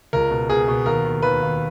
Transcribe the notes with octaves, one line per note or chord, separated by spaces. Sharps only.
C#2 A#4
B2
B2 G#4
B2
D#2 A#4
D#2
D#2 B4
D#2